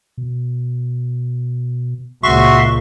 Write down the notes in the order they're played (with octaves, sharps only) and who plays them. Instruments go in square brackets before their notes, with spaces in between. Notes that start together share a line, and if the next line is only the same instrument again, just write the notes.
[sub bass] B2
[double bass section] C#2 A#2 [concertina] F#4 E5 C6 [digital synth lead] C#6